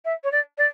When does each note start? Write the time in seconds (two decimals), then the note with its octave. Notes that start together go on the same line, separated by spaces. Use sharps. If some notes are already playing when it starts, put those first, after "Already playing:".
0.05 E5
0.23 C#5
0.31 D5
0.57 D5